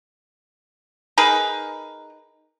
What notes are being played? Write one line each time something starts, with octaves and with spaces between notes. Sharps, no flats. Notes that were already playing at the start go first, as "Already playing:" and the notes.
D#4 G#4 A#4 B4